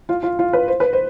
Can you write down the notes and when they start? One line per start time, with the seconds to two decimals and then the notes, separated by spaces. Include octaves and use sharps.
0.09 F4
0.23 F4
0.39 F4
0.53 B4
0.68 C5
0.80 B4
0.93 C5